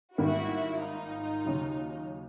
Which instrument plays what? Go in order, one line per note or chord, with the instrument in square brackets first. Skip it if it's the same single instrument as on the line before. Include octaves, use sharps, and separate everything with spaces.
[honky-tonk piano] G#1 G#2 D#3 G3 A#3 [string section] E4 F#4
[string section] D#4 F4
[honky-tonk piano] D#2 C#3 F#3